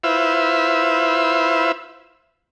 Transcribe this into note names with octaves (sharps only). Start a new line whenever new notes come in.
E4 F4 B4 C5 E5